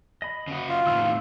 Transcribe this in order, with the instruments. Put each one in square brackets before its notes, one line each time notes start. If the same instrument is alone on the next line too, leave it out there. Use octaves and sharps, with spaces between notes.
[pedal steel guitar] D#5 B5
[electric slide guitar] C#3 F#4
[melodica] F4 [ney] F5
[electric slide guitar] A2 C3 D#3 [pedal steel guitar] E6